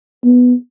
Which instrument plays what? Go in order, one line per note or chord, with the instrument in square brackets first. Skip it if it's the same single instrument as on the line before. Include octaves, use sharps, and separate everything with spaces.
[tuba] B3